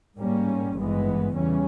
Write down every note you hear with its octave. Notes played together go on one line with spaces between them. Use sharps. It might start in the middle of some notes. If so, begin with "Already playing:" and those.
G#2 G3 A#3 C#4
G#1 G2 E3 G#3 B3
E2 C#3 E3 G3 C#4